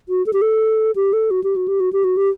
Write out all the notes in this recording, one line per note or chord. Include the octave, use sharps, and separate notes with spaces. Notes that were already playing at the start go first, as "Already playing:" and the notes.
F#4
A4
G4
A4
G4
A4
F#4
G4
F#4
G4
F#4
G4
F#4
G4